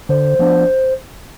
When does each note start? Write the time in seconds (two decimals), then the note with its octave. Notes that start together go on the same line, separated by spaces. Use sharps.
0.09 D3 C5
0.39 F3 B3 D4